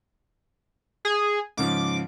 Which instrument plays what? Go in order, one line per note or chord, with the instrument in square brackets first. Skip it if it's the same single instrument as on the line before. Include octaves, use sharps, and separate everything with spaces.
[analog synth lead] G#4
[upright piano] G#2 C#3 F3 [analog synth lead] D6